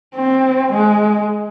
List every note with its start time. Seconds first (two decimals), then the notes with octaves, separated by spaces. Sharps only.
0.15 C4
0.72 G#3